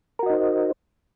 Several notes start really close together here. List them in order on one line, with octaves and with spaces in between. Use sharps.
A#4 F#4 D#5 D#4 C5